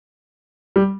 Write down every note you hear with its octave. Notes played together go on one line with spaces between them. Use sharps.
G3